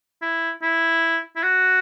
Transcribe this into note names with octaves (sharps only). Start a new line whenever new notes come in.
E4
E4
E4
F#4